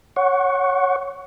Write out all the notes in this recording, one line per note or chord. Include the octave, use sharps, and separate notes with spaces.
C#5 F#5 C#6